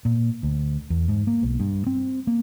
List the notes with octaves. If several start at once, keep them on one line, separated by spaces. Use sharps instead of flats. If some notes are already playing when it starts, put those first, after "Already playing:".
A#2
D2
E2
G#2
A#3
B1
G2
C4
A#3